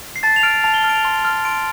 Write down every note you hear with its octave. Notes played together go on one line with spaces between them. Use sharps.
C7
A5 A6
F7
F6 D7
A5 F7
G7
F6
D7
F7
C6
F6
C6 D7